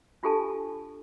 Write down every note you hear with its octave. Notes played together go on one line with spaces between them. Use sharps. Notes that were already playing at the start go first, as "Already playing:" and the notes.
D4 F4 G4 A4 G#5 A5